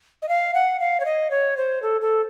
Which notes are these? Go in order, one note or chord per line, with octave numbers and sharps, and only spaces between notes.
D#5
F5
F#5
F5
C#5
D#5
C#5
C5
A4
A4